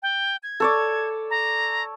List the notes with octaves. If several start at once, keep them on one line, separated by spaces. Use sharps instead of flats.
G5
G#6
A4 C#5 D5
A#5